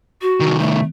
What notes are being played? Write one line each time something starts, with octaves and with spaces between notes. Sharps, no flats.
F#4
C2 D#3
A3